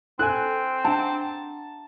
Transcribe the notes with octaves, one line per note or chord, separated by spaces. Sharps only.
C4 E4 A4 G#5 F#6
D4 F#5 A5 A#5